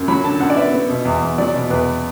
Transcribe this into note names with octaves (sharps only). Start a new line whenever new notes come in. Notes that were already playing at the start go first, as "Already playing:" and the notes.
Already playing: F#2
F#3 B5
D3 A5
F#2 F#5
D5
B3 E5
B3
B2
E2
E2
F#3 D5
B2
E2 B4